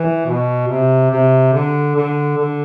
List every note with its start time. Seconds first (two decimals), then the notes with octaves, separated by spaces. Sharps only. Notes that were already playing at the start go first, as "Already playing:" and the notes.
Already playing: E3
0.26 B2
0.68 C3
1.11 C3
1.53 D3
1.95 D3
2.37 D3